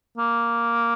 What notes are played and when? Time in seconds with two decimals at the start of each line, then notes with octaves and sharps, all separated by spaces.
0.17 A#3